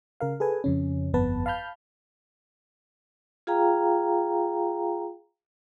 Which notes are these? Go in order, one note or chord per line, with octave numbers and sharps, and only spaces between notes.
C#3 A#4 F5
G#4 A4 B4 G#5
F2 C#3 C#4
G1 F2 B3 B4 A5
F5 A5 B5 F6 G6
F4 G#4 F5 G5 A#5